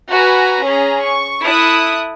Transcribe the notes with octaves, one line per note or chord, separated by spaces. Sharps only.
F#4 B4 G#5 A#5
C#4 G#4 A#5
C#6
E4 A4 D#6 F#6